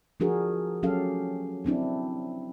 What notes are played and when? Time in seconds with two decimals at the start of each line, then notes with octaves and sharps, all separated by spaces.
0.20 F3 D4 F#4 G#4 A#4
0.83 F#3 C#4 G4 A4 F5
1.64 F#3 C4 D4 E4